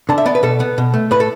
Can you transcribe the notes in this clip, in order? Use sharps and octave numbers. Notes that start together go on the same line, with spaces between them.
D3 A5
E5
B3 D5
B4
B2 A4
B3
B2
A3
A2 B4
A4